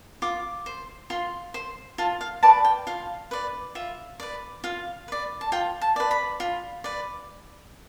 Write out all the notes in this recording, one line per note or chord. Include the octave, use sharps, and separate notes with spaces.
F4 D6
C5
F4 C6
C5
F4 A5
F5
B4 D5 A5
G5
F4 F5
B4 D5
F4 E5
B4 D5
F4 F5
B4 D5
A5
F4 G5
A5
B4 D5
B5
F4
B4 D5